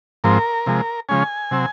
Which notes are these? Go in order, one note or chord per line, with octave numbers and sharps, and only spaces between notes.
G#2 F3 C4 A#4
C3 F3 G#3
C#3 F3 G#3 C#4 G#5
C3 F#3 C4